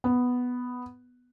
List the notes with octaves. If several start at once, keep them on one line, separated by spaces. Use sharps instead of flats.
B3